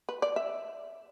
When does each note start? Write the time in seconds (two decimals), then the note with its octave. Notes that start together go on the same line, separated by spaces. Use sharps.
0.09 B4
0.22 D5
0.36 E5